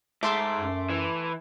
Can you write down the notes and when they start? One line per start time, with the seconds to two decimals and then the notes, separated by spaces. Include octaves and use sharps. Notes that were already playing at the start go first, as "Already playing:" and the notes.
0.23 G#2 A3 E5 C6 D6
0.56 F#2
0.90 E3